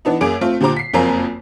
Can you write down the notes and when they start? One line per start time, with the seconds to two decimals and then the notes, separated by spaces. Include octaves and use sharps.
0.05 E3 B3 D4 D#4
0.21 F#2 A#3 G#4 D6 D7
0.41 A3 C4 F4
0.61 A#2 D3 G4 C5 A#5 D6
0.76 B6 C7
0.94 F#1 F2 A#3 C4 G#5 A#5